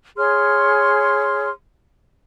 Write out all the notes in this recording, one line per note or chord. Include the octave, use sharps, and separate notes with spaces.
G#4 C#5 C6 F6